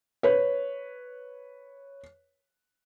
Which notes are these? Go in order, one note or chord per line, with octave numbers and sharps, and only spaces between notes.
B4 C#5